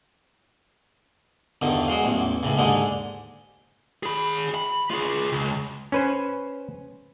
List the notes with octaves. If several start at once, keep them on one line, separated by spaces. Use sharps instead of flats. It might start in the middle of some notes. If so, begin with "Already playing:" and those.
E2 G2 D3 D#3
F#3 G#3 F5
A1 E2
C#2 A2 C#3
D#2 G#2 D3 G#3
G#4 B5
B5
F4 G#4
C#2
C#4 B4 C5